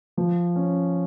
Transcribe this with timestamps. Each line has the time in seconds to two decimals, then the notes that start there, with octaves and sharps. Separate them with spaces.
0.17 F3
0.56 C#4